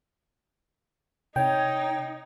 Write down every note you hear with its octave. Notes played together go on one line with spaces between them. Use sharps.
C3 D#4 C#5 G5